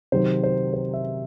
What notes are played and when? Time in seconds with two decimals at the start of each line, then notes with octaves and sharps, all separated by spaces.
0.12 C3 D#3 F#3 C5
0.44 C5
0.74 C5
0.94 E5